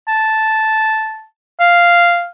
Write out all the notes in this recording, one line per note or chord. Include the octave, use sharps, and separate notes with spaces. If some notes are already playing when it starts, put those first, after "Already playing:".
A5
F5